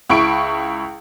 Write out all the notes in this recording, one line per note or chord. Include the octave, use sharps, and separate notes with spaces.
C#2 E4 C#6 D7